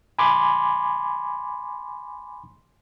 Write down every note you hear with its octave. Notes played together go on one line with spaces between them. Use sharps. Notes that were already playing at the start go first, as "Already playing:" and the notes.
G#5 B5 C6 D6